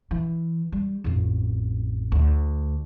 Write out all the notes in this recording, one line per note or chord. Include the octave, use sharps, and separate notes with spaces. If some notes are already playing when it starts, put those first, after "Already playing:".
E3
G3
A1 F2
D2